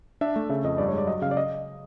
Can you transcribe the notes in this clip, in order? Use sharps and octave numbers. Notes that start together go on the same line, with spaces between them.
D4 E5
A3
C#3 E5
F2 D#5
G2 D5
C#5
G#3
D5
F#3 D#5
C#3 F5
D5
D#5